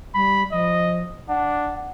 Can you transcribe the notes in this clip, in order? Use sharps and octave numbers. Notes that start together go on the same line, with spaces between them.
G3 B5
F3 D#5
D4 F#5